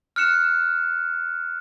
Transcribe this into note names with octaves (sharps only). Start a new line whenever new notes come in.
F6 F#6 C#7 E7